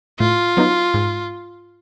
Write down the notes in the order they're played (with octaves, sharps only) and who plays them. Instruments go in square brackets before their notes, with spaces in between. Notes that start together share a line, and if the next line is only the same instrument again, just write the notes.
[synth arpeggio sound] A2 [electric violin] F4
[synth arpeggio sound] F#3 B3 D#4
G#2